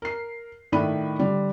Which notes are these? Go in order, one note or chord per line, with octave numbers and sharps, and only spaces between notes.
A#4 C7
A2 D#3 D4 E4 B5 D#7
D3 G3